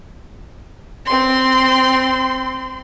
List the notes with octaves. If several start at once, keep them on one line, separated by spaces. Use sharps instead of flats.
C4 C6